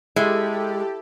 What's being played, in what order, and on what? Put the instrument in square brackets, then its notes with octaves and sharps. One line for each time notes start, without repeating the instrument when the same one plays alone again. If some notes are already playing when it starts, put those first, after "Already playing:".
[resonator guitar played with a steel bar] G#3 [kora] E4 [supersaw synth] G4 A4